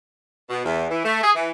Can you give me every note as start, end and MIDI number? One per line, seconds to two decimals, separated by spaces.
0.49 0.63 47
0.65 0.85 40
0.89 1.03 52
1.03 1.21 57
1.22 1.30 68
1.35 1.51 52